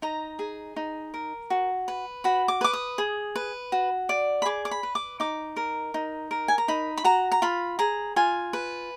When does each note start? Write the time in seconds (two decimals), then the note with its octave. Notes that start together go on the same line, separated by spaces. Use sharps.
0.02 D#4 A#5
0.39 G#4
0.76 D#4
1.14 A#4
1.50 F#4
1.88 B4
2.24 F#4 B5
2.48 D6
2.61 B4 D6
2.73 D#6
2.98 G#4
3.36 B4
3.72 F#4
4.09 D5
4.42 B5
4.46 G#4 D6
4.65 D6
4.71 B5
4.83 B4
4.95 D6
5.20 D#4 D6
5.57 A#4
5.94 D#4
6.31 A#4
6.48 G#5
6.58 A#5
6.68 D#4 B5
6.97 B5
7.04 F#4 A#5
7.32 A#5
7.42 F4 B5
7.79 G#4 A#5
8.16 F4 G#5
8.53 B4